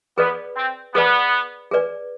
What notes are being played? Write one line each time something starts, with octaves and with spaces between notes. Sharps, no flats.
B3 G#4 B4 D5
C4
B3 G#4 B4 D5
G#4 B4 D5